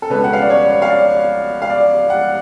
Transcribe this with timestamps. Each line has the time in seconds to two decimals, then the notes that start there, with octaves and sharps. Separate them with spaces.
0.02 A4
0.10 C#2 B2 G#3 C#4 B4
0.24 F#5
0.33 F5
0.42 D5
0.50 C#5
0.82 F5
0.90 D5
1.62 F5
1.70 D5
2.10 F#5